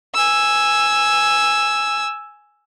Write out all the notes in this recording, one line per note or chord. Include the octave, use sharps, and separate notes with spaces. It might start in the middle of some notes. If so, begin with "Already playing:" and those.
G#5 E6